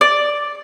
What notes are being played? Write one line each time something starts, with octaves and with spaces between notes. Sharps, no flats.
D5